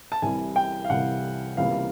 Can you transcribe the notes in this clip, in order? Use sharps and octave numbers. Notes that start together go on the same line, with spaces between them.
A5
C2 C3 E3 G3 G#5
G5
F5
C2 C3 E3 G3 F#5
C#2 C3 E3 G3 A#3 F5